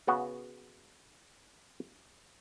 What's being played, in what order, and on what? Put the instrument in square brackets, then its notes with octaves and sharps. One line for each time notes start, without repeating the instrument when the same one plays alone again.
[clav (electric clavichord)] C#3 B3 F#4